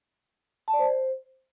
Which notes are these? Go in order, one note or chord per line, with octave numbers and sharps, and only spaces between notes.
A5
D5
C5